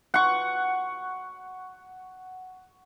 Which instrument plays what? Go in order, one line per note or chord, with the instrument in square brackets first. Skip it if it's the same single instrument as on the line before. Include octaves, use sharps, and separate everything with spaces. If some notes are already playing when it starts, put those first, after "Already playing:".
[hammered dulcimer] F#5 C#6